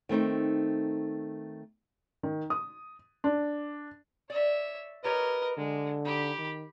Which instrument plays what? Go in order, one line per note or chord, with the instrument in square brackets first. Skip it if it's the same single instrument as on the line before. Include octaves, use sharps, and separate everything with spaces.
[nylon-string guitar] D#3 A3 C4 D#4
[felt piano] D#3
D#6
D4
[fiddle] C#5 E5 [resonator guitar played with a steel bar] D5
[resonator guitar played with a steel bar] F4 G4 C#5 [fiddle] A#4 D#5 [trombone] B4
[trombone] D3 [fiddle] G#3
[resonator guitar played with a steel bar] D#4 [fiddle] G4 B5
[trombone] D#3